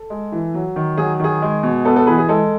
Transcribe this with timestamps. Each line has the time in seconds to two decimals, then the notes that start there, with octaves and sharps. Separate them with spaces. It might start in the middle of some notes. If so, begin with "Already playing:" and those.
Already playing: A4
0.10 G#3
0.32 E3
0.54 F#3
0.76 D#3
0.98 F#3 G#4
1.19 D#3 G#4
1.42 G#3
1.63 B2
1.85 B3 A4
1.96 A4
2.07 E3 G#4 B4
2.18 G#4
2.29 G#3 A4